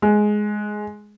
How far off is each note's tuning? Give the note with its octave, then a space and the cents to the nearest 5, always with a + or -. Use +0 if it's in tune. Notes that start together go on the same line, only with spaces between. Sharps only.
G#3 +10